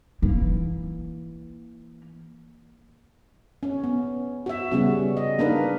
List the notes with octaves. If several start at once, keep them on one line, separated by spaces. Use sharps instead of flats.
E3 A#3
C#4
B3
F#4 E5
C#3 G3 B3 C#4 F#4
D#5
A#3 D4 D#4 A#4 B4